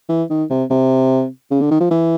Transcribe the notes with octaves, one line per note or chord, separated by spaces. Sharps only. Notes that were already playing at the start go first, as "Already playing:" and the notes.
E3
D#3
C3
C3
C#3
D3
D#3
F3
E3